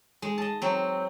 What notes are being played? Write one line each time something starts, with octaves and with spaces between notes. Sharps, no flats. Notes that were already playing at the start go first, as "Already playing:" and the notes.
G#3
D#5 A5
F#3 C4